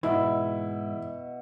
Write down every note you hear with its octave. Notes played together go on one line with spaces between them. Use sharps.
G#2 B2 E3 E4 E5 F#5